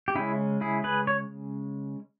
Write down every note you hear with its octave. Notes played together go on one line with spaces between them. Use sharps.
G4
C#3 G#3 C#4 E4 G#4
E4 G#4
G#4 B4
C#5